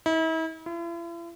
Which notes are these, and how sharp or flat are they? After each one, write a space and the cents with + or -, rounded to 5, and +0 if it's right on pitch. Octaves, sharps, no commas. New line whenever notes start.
E4 -40
E4 +45